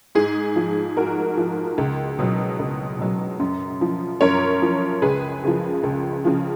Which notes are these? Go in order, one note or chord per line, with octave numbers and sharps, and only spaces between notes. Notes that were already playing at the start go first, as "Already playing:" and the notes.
G#2 G#4
F3
G#2 F#4 A#4
F3
C#2
B2 F#3
C#2
B2 F#3
F#2
F3
F#2 A#4 C#5
F3
C#2 G#4 B4
C#3 F3
C#2
C#3 F3